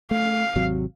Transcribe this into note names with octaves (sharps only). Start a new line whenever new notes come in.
A3 F5
G#1 C3 F#3